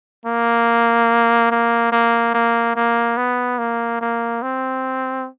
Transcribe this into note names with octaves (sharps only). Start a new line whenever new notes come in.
A#3
A#3
A#3
A#3
A#3
B3
A#3
A#3
C4